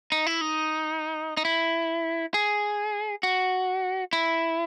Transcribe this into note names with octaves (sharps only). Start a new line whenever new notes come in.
D#4
E4
D#4
D#4
E4
G#4
F#4
E4